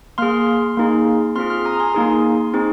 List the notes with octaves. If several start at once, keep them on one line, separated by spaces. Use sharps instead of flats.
A#3 G#4 C6 F6
A#3 D#4 G#4
C4 F4 G#4 C6 F6
C6 F6
A#5 D#6
G#5 C6
A#3 D#4 G#4
C4 D#4 G#4